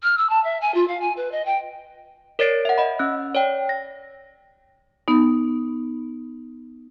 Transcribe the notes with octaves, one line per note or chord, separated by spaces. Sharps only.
F6
E6
A5
E5
G#5
F4
F5
G#5
B4
D#5
G5
A#4 C#5 D5 A6 C7 D7
E5 F#5
D#5 F#5 B5
C#4 E6 F#6
C#5 D5 G5
A#6
B3 D#4